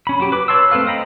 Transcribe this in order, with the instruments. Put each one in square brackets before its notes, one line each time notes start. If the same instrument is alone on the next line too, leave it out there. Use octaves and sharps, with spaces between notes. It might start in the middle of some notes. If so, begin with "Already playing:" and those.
[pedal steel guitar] C#4 B5
F#3 G4
B4 D6
B4 C#5 A5 C6 E6
A3 C4 A4 B4 F5
C5 D#5 G5 A#5 B5